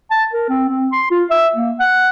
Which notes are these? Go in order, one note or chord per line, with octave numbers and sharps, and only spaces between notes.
A5
A#4
C4
C4
C6
F4
E5
A#3
F#5